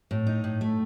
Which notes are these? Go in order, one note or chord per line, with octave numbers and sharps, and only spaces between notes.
A2
D#4
A2
A3